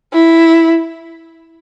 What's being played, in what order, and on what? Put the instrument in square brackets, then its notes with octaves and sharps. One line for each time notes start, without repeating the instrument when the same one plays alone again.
[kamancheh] E4